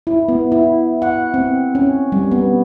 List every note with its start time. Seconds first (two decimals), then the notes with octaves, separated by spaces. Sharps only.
0.07 E4
0.28 B3
0.52 E4
1.02 F#5
1.34 C4
1.75 C#4
2.12 G3
2.31 B3